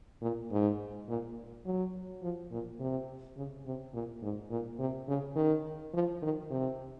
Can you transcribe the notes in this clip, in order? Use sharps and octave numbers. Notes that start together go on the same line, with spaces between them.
A#2
G#2
A#2
F#3
F3
A#2
C3
C#3
C3
A#2
G#2
A#2
C3
C#3
D#3
F3
D#3
C3